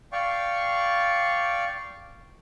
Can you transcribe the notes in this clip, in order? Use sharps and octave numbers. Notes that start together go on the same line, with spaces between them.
D5 F5 G5 C#6